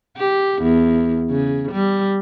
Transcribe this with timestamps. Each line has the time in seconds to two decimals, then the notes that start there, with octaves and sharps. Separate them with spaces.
0.17 G4
0.62 E2
1.30 C#3
1.72 G3